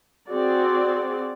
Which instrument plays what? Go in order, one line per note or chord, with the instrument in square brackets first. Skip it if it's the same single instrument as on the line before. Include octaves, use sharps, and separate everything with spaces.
[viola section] C4 F#4 G#4 D5